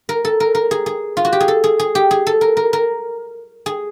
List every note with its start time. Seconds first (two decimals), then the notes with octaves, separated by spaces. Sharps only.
0.09 A#4
0.25 A4
0.40 A#4
0.55 A#4
0.71 G#4
0.86 G#4
1.17 F4
1.25 F#4
1.33 G4
1.40 G#4
1.48 A4
1.64 G#4
1.80 G#4
1.95 G4
2.11 G#4
2.27 A4
2.41 A#4
2.57 A#4
2.73 A#4
3.66 G#4